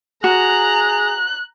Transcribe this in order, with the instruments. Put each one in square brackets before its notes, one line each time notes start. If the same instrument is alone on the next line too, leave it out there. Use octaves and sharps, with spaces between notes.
[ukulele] F#4 [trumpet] G#4 [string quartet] A#5 [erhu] F#6